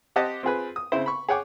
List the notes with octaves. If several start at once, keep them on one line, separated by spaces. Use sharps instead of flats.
C4 G4 C5 D#5 F#5 A5
C4 F4 G#4 B4
D#6
C#3 C4 E4 C5
B5 C#6
G#4 C#5 F#5 G5 D6